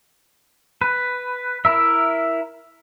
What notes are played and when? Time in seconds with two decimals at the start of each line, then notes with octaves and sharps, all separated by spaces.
0.82 B4
1.65 E4 A#4 E5